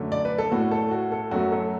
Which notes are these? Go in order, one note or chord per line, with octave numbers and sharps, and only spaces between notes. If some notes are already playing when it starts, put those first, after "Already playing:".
Already playing: F#2 D3 A3
D5
B4
A4
A2 A3 F#4
A4
F#4
A4
F#2 F#3 A3 F#4
A4